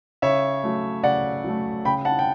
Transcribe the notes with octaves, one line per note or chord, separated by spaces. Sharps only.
C#3 C#5 E5
F#3 A3
C#3 D5 F#5
F#3 A3
C#3 G5 B5
F#5 A5
G5